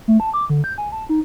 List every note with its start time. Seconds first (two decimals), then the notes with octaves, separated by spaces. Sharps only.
0.08 A3
0.20 A5
0.34 D6
0.50 D3
0.64 G6
0.78 G#5
0.92 A5
1.09 D#4